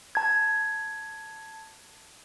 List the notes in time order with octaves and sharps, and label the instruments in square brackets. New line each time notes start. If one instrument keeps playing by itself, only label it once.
[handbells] A5 G#6